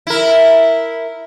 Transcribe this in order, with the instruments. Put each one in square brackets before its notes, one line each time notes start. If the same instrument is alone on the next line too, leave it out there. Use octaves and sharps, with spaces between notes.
[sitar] E4 A#4